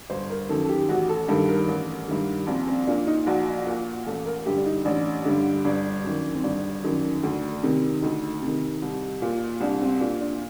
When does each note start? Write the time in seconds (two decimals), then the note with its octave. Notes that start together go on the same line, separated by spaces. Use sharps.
0.10 G1 C5
0.30 A#4
0.49 F#2 D#3 A4
0.64 A4
0.69 G4
0.89 A1 F#4
1.09 A4
1.28 G2 D#3 A4
1.49 A#4
1.68 A1
2.08 G2 D#3
2.47 A#1 C4
2.67 C4
2.87 A#2 D4
3.07 D#4
3.27 A#1 F#4
3.66 A#2
4.06 A1 A4
4.25 A#4
4.46 G2 D3 G4
4.57 D4
4.66 D#4
4.85 A1 D4
5.25 G2 D3
5.65 G1 D4
6.04 F#2 D#3
6.35 C4
6.43 G1 D4
6.84 F#2 D#3
7.23 D2
7.63 C3 D#3
8.02 D2 D#4
8.42 C3 D#3
8.82 C2
9.22 A#2
9.61 C2 D4
9.81 C4
10.00 A#2 D4
10.21 D4